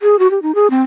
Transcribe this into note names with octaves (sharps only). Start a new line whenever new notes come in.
G#4
F#4
G4
D#4
G#4
C4